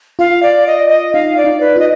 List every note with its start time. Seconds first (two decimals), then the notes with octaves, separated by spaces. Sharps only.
0.19 F4 F5
0.43 D5
0.67 D#5
0.90 D#5
1.13 D#4 F5
1.37 D5
1.44 D#4
1.61 B4
1.76 F4 D#5